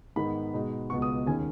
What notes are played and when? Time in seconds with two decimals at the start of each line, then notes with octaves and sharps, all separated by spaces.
0.16 G#2 D#3 G#3 B3 B5
0.54 B2 G#3 D#4
0.90 C#2 B2 G#3 B3 C#6
1.02 D#6
1.26 D#2 D#3 G#3 C#4 G#5